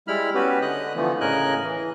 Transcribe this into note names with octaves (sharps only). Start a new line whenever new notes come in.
G3 G#3 E4 B5 F6
B3 C#4 F#4 G4 B4
D3 D#5 D#6 F#6
D3 E3 F3 A3 B3
A2 C#3 A#4 D#5 G#5 F#6
E3